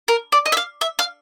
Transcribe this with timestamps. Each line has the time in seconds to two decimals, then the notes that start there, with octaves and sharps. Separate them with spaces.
0.08 A#4
0.32 D5
0.46 D#5
0.52 E5
0.57 F5
0.81 E5
0.99 F5